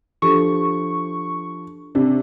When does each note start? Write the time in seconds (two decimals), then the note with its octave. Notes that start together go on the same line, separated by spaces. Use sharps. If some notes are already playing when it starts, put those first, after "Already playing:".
0.22 F3 D4 G4 A4 C#6
1.95 C3 D4